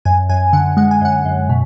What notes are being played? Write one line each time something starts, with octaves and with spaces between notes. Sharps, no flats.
F#2 G#5
F#2 G#5
D3 F#5
G#3 F#5
G#5
F#2 F#5
F#2
B2